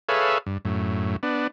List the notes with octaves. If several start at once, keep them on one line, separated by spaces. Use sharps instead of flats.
G#4 A4 B4 C#5 E5 F5
G2
F#2 A2
B3 D4